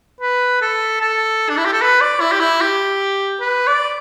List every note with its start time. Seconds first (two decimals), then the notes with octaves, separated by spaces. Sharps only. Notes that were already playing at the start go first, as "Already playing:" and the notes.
0.21 B4
0.62 A4
1.01 A4
1.50 D4
1.57 E4
1.66 G4
1.73 A4
1.82 B4
2.01 D5
2.20 E4
2.32 G4
2.40 E4
2.61 G4
3.41 B4
3.68 D5